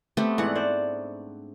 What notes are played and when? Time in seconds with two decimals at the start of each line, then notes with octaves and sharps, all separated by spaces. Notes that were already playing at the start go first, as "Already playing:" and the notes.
0.17 A3 B3 C4 G4
0.38 G#2 E3 D5 F#5
0.55 D4 C5 D5